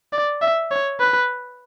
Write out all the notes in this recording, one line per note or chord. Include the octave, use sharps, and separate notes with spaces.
D5
E5
C#5
B4